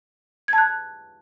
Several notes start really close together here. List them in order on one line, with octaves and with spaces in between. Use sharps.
G#6 A5 F#6